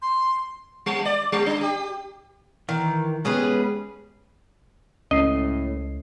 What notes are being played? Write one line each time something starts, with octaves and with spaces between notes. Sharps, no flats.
C6
G3
D5
G3
D4
G4
D#3 E3
G#3 B3 C#4 G4 G#4 B4
C#2 A2 C#4 D#5 C7